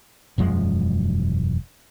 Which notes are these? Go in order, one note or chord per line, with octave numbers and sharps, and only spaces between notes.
E1 F#2 F3 G#3